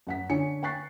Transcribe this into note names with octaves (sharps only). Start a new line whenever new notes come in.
F#2 F#5 B6
D3 C#5 G#5 C#7
G5 G#5 C#6 F#6 A6 C7